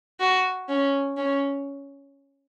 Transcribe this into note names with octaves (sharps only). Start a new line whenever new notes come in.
F#4
C#4
C#4